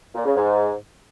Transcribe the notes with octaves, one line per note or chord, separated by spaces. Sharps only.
A#2
C#3
G#2